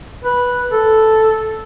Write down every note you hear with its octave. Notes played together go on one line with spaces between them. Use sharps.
B4
A4